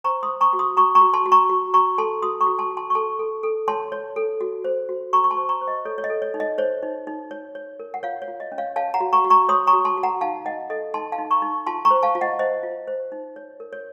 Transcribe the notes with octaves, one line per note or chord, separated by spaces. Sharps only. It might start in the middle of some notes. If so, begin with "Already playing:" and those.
C5 A#5 C#6
C6 D#6
C5
A#5 C#6
F#4
C6 D#6
F#4 A#5 C#6
A#5 C#6
F#4
A5 C6
F#4
A#5 C#6
F#4
F#4 A#5 C#6
A4 A5 C6
F#4 C6 D#6
A#5 C#6
F#4
A5 C6
F#4
A5 C6
C#6
A4 A5 C6
A4
A4
C#5 A5 C6
C#5
A4
F#4
C5
F#4
F#4 A#5 C#6
C#6
A5 C6
C5
A#5 C#6
C5
D#5
A4 C#5
C#5
D#5
A4
C#5
D#4
D#5
C5 C#5
D#4
D#4
C#5
C#5
A#4
F#5
F4 C#5 F5
C#5
F4
D#5
C#4
C#5 F5
C#5 F5 A5
F#5 A#5
F#4
A#5 C#6
F#4
A#5 C#6
C#5 C6 D#6
A#5 C#6
F#4
A5 C6
F#4
F#5 A#5
D#4 F5 A5
D#4 D#5 F#5
A4 D#5
D#4 A5 C6
F5 A5
D#4
A#5 C#6
D#4
F4 A5 C6
A#5 C#6
C5
F5 A5
F4
D#5 F#5
C5 D#5
F4
C5
D#4
C#5
A#4
C#5